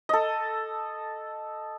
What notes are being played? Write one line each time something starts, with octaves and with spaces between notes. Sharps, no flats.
A4 D#5